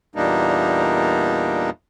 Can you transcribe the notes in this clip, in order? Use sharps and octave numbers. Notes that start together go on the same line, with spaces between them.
E2 A#2 G3 A#3 D4 D#4